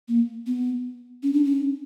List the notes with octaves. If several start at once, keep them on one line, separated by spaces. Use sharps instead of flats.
A#3
B3
C#4
D4
C#4